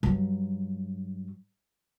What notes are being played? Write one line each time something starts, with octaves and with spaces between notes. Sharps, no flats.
G2 F#3